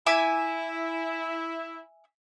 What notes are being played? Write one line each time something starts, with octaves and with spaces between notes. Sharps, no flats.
E4 E5 G#5 D6